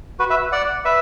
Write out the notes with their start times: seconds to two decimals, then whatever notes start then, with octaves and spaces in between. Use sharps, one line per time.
0.19 F#4 B4
0.30 B4 E5
0.52 D5 F#5
0.85 B4 E5